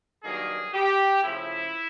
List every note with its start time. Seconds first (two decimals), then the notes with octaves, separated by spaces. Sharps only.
0.22 G2 D#3 F#3 A#3 G#4
0.73 G4
1.22 C#3 F3 A3 E4